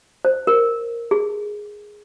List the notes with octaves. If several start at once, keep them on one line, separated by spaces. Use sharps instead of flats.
C5
A#4
G#4